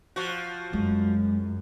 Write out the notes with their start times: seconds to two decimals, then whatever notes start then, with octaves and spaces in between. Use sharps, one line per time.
0.16 F3 F#4
0.73 F#2 G#3